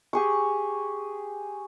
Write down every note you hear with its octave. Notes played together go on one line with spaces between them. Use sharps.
G4 G#4 C#6